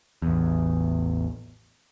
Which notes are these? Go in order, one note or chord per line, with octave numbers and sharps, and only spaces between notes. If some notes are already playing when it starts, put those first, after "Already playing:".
A1 E2